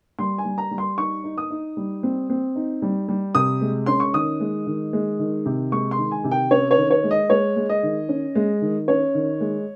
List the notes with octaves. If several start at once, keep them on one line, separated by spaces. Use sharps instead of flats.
G3 C6
G#5
G3
A#5
G3
C6
D#4 C#6
D#4
D#6
D#4
G3
C4
C4
D#4
G3
G3
C3 D#6
G#3
C#4 C6
C#6
D#3 D#6
G#3
D#3
G#3
D#3
C3
G#3 C#6
C6
D#3
G#5
C3
G5
C#4 C#5
C#5
D#3
C#5
G#3
D#5
G#3 C#5
G#3
D#5
D#3
C#4
G#3
D#3
C#4 C#5
D#3
G#3